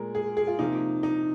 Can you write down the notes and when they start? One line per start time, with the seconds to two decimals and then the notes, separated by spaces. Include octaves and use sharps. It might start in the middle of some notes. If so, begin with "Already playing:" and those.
Already playing: A#2 G#3 A#4
0.15 G#4
0.37 G#4
0.47 F4
0.59 C3 F3 A#3 D#4
1.03 D#4